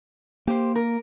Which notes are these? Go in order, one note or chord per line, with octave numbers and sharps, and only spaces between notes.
A#3 G4 C5
A#4